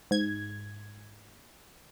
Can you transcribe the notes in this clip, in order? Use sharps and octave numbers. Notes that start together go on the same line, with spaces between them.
G#2 G#6